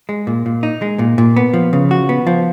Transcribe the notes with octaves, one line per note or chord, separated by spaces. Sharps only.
G#3
A#2
A#2
D#4
G#3
A#2
A#2
B3
F3
C#3
F#4
B3
F3